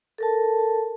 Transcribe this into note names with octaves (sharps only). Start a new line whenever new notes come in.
A4 A#4 A5